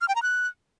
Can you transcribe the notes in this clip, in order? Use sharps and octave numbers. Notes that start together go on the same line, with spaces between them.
F6
G5
A#5
F#6